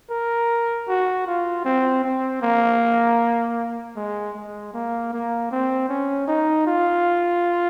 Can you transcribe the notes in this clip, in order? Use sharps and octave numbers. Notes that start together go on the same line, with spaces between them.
A#4
F#4
F4
C4
C4
A#3
G#3
G#3
A#3
A#3
C4
C#4
D#4
F4